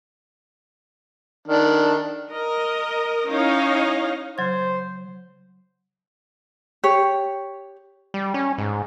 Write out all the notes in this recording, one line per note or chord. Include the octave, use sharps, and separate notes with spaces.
D#3 D4
A#4 D#5
C#4 D#4 E4 C#5 D#5 F5
C#3 F#3 C5 G#6
G4 C#5
G3
C#4
G#2